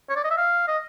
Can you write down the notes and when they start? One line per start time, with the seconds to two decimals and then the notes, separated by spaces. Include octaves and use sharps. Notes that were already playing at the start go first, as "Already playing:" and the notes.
0.09 C#5
0.16 D5
0.24 D#5
0.31 E5
0.37 F5
0.68 D#5